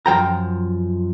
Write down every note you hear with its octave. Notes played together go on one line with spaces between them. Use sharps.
F#2 F3 G5 A#5